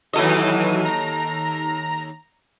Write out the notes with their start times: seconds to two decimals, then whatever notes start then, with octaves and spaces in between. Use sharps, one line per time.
0.13 D#2 E3 F#3 A4 D#5 D#7
0.85 A#5